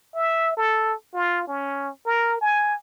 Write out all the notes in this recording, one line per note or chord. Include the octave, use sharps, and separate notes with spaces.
E5
A4
F4
C#4
A#4
G#5